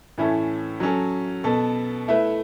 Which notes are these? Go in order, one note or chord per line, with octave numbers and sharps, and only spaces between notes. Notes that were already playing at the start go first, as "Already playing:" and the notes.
A2 E3 C#4 E4 A4
F#3 C#4 A4
B2 B3 A4
A3 E4 B4